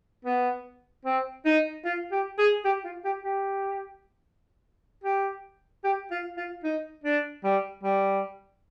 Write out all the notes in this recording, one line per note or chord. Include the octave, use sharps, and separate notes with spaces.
B3
C4
D#4
F4
G4
G#4
G4
F4
G4
G4
G4
G4
F4
F4
D#4
D4
G3
G3